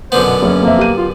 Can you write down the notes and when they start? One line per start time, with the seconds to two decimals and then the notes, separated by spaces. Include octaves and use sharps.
0.12 F#2 D3 B3 C5
0.25 B2
0.42 F#1 C#4
0.63 F2 A#3 C5 E5
0.79 G4 D#7
0.98 F4